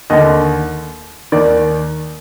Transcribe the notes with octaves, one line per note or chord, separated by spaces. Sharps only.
D#2 D3 D#5
D#2 D#3 D5